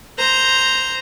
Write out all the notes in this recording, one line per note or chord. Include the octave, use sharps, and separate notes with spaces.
C5 A#5